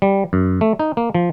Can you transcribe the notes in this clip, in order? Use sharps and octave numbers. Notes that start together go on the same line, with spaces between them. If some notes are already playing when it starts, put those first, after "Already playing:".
G3
F#2
A3
D#4
A#3
F3